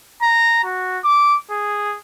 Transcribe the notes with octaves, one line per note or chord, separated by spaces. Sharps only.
A#5
F#4
D6
G#4